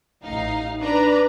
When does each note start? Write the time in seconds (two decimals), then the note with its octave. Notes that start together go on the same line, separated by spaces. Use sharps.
0.23 A1 D#4 F5
0.81 D4 B4 A#5